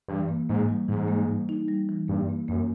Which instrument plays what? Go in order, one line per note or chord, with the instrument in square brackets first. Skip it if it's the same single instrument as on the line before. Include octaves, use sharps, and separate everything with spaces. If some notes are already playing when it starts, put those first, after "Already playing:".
[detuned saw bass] G2 [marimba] E3
[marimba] A#3
[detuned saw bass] G#2 [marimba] A#3
[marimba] G3
[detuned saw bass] G#2 [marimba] E3
[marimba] A#3
G3
D#4
G3
E3
[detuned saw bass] G2 [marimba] A#3
[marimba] A#3
[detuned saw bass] F#2 [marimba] A#3